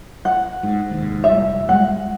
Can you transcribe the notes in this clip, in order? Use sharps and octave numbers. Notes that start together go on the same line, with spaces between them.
F#5
G#2
F1 D#2 G#2
F1 G3 E5
E2 G3 G#3 F#5